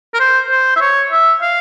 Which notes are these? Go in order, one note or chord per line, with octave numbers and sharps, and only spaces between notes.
A#4
C5
C5
E5
C#5
E5
F5